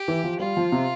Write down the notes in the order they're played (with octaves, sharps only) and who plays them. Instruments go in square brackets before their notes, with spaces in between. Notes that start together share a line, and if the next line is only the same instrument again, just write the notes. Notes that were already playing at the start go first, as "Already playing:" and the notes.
Already playing: [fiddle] G4
[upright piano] E3
F3
[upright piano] G3 [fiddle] F4
[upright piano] F3
C3